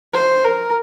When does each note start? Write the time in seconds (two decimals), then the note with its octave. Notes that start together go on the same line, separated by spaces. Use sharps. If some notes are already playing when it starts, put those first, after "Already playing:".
0.13 C5
0.44 A#4